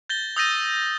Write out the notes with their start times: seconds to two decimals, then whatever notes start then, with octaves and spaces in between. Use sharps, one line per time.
0.10 G6 A6 A#6 G7
0.36 D#6 E6 G6 A6 A#6 D#7